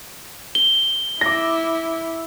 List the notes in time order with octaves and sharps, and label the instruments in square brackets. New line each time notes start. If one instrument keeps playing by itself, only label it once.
[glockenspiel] G7
[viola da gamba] E4 [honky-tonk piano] D6 A#6